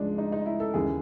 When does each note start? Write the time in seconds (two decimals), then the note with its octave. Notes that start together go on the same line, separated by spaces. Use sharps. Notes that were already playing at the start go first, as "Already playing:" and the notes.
Already playing: C#2 C#3 F3 G#3 D4
0.18 D#4
0.32 D#4
0.46 E4
0.60 A4
0.74 D#2 C#3 E3 G#4